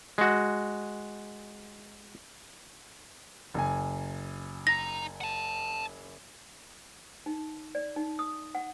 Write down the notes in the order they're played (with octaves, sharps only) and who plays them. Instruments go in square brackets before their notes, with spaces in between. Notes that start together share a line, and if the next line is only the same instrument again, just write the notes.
[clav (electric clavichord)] G#3 F#4
[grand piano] F#1 G#5
[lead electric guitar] D#4 A#5 [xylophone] A#6
[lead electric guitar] F#5 A5
[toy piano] D#4
D5
D#4
D#6
F#5